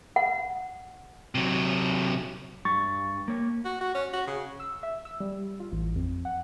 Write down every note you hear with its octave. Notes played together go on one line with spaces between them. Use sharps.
F#5
C3 F#3
G2 C#6 A6
A#3 C#5
F#4
F#4
C#4
F#4
C#3
E6
E5
E6
G3
F4
A1
F2
F#5